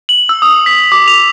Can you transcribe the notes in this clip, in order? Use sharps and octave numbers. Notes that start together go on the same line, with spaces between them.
F#7
E6
D#6
B6
D6
F7